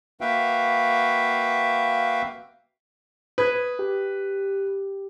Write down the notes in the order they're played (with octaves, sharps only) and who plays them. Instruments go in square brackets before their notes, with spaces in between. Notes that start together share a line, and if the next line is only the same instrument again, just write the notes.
[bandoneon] A#3 F#4 B4 E5 F5 G5
[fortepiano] B4 [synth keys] D#6 G#6
[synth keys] G4